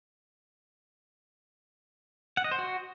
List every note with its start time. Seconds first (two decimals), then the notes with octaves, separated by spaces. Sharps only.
2.37 F#5
2.44 D#5
2.51 C5
2.59 F#4